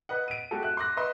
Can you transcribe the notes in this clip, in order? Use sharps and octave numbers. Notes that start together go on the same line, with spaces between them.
B4 D#5 F#5
D7 D#7
G#3 F#4 G4 A4
E5 F#6
C6 D6 F#6 A#6
B4 D#5 E5 B5 C6